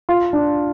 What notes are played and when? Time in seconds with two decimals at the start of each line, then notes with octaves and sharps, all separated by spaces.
0.09 F4
0.33 D4